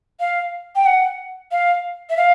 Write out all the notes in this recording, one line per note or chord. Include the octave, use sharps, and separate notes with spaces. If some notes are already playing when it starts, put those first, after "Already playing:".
F5
G5
F#5
F5
E5
F5